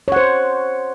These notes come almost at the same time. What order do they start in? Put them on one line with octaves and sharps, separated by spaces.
C#5 F#5 C5